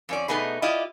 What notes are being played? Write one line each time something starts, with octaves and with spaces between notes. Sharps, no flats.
F2 C#4 D5
B2 A3 B3 D#4 G#4
E4 F4 G4 D5 D#5